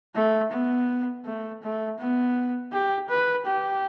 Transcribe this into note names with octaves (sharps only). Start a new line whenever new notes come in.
A3
B3
A3
A3
B3
G4
B4
G4